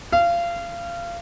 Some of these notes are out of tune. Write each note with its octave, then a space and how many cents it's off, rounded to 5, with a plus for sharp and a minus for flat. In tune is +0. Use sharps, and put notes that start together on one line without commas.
F5 -25